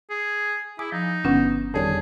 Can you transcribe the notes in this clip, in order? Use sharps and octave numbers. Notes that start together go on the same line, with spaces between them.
G#4
E4 G#4 D6
F3 D#4
G1 B3 C#4 D4 F4
F2 D3 D#3 G3 G#4 C#5 A5